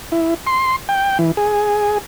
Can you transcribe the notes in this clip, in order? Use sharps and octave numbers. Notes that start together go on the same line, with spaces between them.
E4
C6
G5
E3
G#4